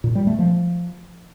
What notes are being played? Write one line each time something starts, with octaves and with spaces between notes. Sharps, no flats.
A#2
G3
A3
F3